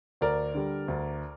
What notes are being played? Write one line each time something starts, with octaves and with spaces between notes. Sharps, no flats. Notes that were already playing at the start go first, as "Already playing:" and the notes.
D2 A#4 D5
D3 G3
D2